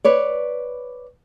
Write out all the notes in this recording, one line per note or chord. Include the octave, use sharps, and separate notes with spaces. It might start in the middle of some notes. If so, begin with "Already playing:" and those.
B4 C#5 D5